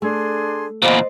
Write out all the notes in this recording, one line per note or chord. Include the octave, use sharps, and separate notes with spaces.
A3 D4 G#4 C6
E2 A#2 C5 D5 D#5 F5 B5